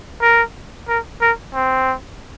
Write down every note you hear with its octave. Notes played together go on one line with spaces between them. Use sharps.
A#4
A#4
A#4
C4